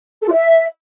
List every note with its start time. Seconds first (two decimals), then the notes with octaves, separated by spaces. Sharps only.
0.21 A4
0.27 F4
0.32 E5